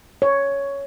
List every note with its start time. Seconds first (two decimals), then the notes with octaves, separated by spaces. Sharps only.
0.22 C#5